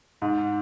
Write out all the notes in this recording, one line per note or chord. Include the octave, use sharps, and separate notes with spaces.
G#2